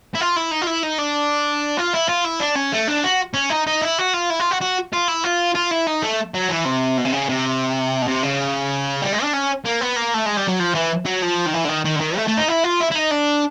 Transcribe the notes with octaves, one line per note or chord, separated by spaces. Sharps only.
E4
F4
E4
D#4
F4
E4
D#4
D4
F4
E4
F4
E4
D4
C#4
A3
D4
F#4
C#4
D#4
D#4
E4
F#4
F4
E4
F4
F#4
F#4
F4
E4
F4
F4
E4
D#4
A3
F#3
E3
C3
B2
C3
C#3
C3
B2
C3
C#3
G3
G#3
D4
C#4
A#3
B3
A#3
A3
G#3
G3
F#3
F3
E3
F#3
F3
D#3
E3
D3
D#3
D#3
D3
D#3
A3
A3
D#4
E4
F4
E4
E4
D#4
D4